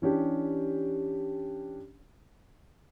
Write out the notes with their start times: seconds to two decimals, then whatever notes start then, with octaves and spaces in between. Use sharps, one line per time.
0.02 E3 C#4 D4 G4